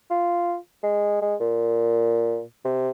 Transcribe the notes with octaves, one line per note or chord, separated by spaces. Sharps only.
F4
G#3
G#3
A#2
C3